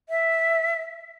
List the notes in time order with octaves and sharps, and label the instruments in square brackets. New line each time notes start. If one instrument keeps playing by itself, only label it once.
[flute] E5